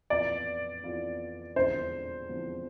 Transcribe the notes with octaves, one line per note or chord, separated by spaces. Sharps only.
F2 E3 B3 F4 D5
F2 E3 B3 F4
E1 E2 D3 F3 C4 C5
E1 E2 D3 F3 C4